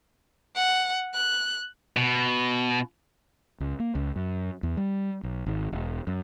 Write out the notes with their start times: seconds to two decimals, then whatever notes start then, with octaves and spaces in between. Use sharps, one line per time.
0.55 F#5
1.14 F#6
1.97 B2
3.60 C#2
3.80 A#3
3.95 C#2
4.16 F#2
4.63 E2
4.77 G3
5.23 B1
5.46 G#1
5.72 E1
6.07 F#2